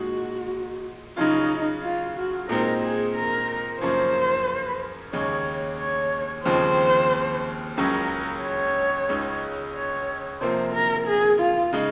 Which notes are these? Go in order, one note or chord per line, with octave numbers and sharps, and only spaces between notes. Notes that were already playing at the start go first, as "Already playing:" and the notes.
Already playing: A#2 G#3 D#4 F#4
C#3 F#3 C#4 D#4 F4
F4
F#4
A#2 G#3 C4 D#4 A#4
G#4
A#4
F#2 C#3 F3 A#3 C#4 C5
D#2 C#3 G#3 D#4 C#5
C#5
D#2 C#3 F3 G#3 C4 C5
C#2 C#3 F#3 C#4 A#4
C#5
C#2 C#3 G#3 D#4
C#5
C3 F3 A#3 C5
A#4
G#4
F4
C#3 G#3 D#4